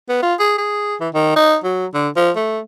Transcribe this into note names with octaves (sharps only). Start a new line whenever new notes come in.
B3
F4
G#4
G#4
E3
D#3
D#4
F#3
D3
F3
A3